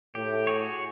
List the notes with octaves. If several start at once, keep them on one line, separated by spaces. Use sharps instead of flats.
A2 G4
F#4 G#4 C#5